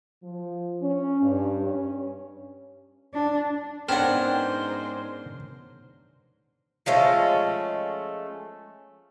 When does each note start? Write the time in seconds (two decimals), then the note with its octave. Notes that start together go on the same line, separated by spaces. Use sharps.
0.23 F3
0.82 C#4
1.21 G2
1.66 C#4
3.14 D4
3.89 G#2 B3 C#4 D4 A#4 C5 F#5 G5
6.86 F3 G#3 A3 C#4